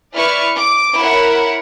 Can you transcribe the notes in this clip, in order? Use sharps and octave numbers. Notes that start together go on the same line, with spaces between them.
E4 B4 D5 C#6 F6
D6
E4 A#4 C#5 F#5